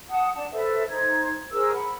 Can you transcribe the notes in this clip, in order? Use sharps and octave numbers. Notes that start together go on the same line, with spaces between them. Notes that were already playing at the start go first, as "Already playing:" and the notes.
F#5 A5 D#6
D4 A5
A4 B4 C5 E5
D#4 C5 G#6
G#4 A#4 C5 E6
F#5 B5